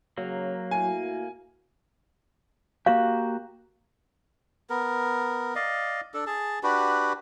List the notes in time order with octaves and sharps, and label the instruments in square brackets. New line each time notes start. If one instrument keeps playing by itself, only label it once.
[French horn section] C#3 C#5 [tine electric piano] F#3 [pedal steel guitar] A#3
[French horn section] A2 E4 F#4 [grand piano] G#5
[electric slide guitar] A#3 F#4 G4 [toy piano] F5
[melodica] B3 A#4
D5 D#5 F5
D4 A4
G#4 A5
D4 F#4 G4 B4